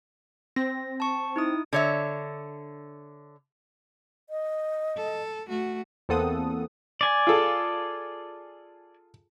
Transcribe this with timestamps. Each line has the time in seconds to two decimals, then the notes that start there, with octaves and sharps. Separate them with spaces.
0.56 C4 A#6
1.00 A5 C#6
1.36 D#4 E4 D#6
1.73 D3 C#5 E5
4.30 D#5
4.96 A4
5.47 A3 F#4
6.09 E2 A#3 C4 A4 F#5 D#6
7.01 D5 G#5
7.27 F4 G#4 A4